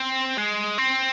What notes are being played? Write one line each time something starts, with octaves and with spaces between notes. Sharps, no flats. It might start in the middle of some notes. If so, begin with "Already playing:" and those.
Already playing: C4
G#3
C4